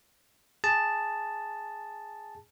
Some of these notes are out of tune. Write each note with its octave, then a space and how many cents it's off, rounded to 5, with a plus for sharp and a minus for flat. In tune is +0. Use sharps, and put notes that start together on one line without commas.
G#4 -10 A5 +0